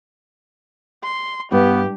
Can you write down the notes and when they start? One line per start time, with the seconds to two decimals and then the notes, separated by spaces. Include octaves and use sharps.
1.04 C6
1.52 G2 B3 G4